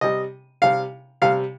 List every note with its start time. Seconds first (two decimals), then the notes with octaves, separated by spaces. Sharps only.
0.01 C3 G3 D#5
0.62 C3 G3 F5
1.22 C3 G3 F5